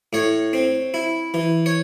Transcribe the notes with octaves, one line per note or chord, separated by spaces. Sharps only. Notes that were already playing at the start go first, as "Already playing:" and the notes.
A2 C#5
C4
E4
E3
C#5